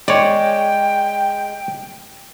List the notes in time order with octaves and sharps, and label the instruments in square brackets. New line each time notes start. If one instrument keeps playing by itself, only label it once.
[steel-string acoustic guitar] G#3 [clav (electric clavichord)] C#5 D5 [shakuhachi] G5